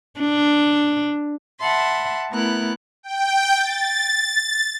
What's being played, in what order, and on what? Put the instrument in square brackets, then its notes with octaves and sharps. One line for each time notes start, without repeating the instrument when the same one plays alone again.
[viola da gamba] D4
[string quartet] E5 F#5 A5 B5 C6
A3 B3 E4 A#4 F#6
[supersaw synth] G5
A6